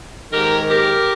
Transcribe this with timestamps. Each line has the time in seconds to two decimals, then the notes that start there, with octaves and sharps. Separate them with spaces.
0.31 G#2 D#3 G4 A#4
0.69 G4 A#4